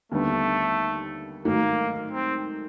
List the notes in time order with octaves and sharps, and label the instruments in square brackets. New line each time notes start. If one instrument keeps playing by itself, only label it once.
[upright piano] D#2 D3 G3 B3 [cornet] A3
[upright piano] G#2 D#3 F#3 A3 [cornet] A#3
[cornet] C4